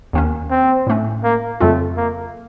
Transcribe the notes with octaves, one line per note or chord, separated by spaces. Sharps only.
D#2 D#3 A#3 C#4
C4
A2 A3 C#4
A#3
F2 C#3 F#3 A3 C4 F4
A#3